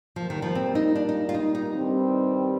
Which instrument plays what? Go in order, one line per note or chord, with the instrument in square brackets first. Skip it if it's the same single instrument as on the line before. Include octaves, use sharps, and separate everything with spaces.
[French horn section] A#2 G3 A#3 [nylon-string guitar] F3
[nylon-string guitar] D#3
F3
C4
D#4
D4
D#4
F4
D#4
D#4
[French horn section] G2 D#3 G3 C4